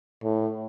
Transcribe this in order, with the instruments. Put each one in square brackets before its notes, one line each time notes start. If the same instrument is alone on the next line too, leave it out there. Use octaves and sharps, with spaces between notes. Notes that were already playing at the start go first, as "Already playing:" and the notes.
[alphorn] A2